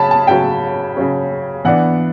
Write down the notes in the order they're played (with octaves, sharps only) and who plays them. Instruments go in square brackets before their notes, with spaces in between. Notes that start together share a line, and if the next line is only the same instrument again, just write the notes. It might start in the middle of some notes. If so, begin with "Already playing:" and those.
Already playing: [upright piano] C#3 F#3 C#4 A5 B5
A5
C#3 F#3 C#4 G5
C#3 F#3 C#4
E3 B3 D4 F#5